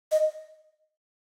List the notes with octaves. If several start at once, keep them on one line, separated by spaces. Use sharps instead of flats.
D#5